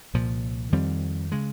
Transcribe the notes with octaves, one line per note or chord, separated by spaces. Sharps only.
C2 A#2 F3
F2 D#3 G3 C4
C#3 G#3